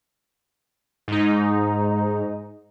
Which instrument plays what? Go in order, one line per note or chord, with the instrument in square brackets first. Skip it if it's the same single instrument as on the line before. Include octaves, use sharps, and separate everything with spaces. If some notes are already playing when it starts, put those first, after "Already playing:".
[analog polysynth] G#2 D#4